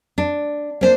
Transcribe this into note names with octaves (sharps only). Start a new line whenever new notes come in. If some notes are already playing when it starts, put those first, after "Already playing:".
D4
A#3 C#4 D4 C5